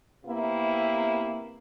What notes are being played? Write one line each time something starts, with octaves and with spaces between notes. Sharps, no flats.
C3 A#3 B3 E4